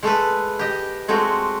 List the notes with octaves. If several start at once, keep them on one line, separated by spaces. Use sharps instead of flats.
G#3 A3 A4 B4
G4 D#5
G#3 A3 C4 F#4